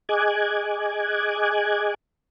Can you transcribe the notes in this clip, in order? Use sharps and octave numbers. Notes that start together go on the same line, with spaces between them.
G#4 D#5 G#5 D6 F#6 G#6